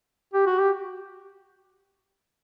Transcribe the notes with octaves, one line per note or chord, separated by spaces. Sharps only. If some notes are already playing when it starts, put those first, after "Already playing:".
G4
F#4
G4